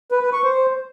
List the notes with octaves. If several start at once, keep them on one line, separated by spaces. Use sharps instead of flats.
B4
B4
C#6
C5